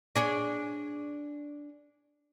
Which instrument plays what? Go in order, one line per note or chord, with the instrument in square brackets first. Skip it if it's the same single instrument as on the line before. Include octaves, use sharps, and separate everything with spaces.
[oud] D4 G#4 C#5